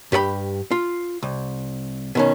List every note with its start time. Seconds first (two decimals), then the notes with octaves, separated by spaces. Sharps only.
0.12 G2 G4 D5 B5
0.71 F4
1.23 C2
2.15 B2 D#3 C#4